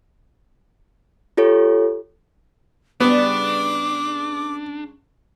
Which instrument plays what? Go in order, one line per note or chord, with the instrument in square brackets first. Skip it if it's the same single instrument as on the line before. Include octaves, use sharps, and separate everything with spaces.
[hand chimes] F4 G4 A4 C#5
[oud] C#3 G3 [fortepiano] B3 [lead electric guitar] D4 [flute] D6